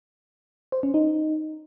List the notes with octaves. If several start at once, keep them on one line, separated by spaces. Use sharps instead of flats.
C5
C#4
D#4